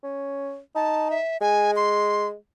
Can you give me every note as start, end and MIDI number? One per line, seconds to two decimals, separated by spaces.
0.03 0.58 61
0.75 1.17 63
0.75 1.08 81
1.10 1.37 76
1.41 2.34 56
1.41 1.71 80
1.76 2.27 84